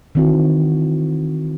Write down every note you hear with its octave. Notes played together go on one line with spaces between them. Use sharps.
D#3 E3 C4 E4 F#4